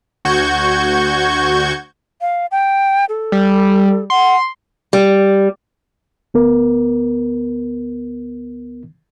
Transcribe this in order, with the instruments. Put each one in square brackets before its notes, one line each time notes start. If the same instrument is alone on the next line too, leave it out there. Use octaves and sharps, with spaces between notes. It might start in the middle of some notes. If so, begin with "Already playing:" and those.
[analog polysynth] D2 F#4 C#6 G6 G#6
[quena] F5
G5
A4
[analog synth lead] G3
[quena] F#5 [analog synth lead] C6
[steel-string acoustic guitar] G3
[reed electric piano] D2 B3 A#4